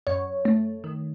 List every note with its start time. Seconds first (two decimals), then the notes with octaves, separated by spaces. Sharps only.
0.07 F#2 C#5
0.45 A3
0.84 D#3